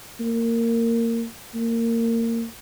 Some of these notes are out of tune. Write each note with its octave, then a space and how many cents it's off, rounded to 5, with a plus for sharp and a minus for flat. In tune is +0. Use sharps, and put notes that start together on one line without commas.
A#3 -20
A#3 -25